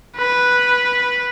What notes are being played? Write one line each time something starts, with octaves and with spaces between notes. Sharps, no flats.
B4